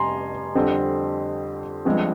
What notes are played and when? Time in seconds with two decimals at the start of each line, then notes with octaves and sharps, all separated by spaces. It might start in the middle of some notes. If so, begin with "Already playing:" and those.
Already playing: F1 G3 G#5 A#5 C6
0.55 F2 D3 G3 C4
1.85 G1 G2 F3 G#3 C4